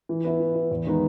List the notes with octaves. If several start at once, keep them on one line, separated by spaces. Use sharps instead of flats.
E3
B3 E4
E3
B3 E4
E2
D#3 G#3 B3 D#4